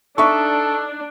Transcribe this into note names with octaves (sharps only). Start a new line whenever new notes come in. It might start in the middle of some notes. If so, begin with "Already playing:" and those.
D4 D#4 A4 E5 C#6